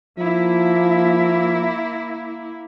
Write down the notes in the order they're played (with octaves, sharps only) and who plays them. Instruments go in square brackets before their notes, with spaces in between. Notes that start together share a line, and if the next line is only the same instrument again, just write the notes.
[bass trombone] F3 [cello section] A#3 E4